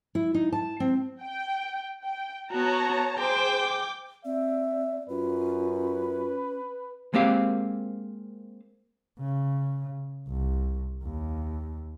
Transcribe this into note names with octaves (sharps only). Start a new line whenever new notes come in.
E4
D#4
A5
C4
G5
G5
B3 F#4 C#5 A5 A#5
G#4 C5 G5 D6
C4 D5 E5
F#2 C#4 F4 B4
G#3 A#3 C4 G4 F5
C#3
C2
D#2